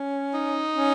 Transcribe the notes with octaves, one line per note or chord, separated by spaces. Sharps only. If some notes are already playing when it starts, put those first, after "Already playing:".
Already playing: C#4
D#4
C#4